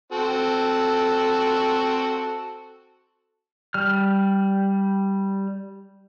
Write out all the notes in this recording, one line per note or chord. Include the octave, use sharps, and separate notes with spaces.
C4 F#4 A4
G3 F6